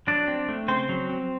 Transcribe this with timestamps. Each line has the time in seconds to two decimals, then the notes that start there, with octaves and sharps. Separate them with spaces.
0.07 F#3 D4 D5
0.27 C4
0.48 A3
0.68 C#3 C4 C5
0.89 F#3
1.09 C4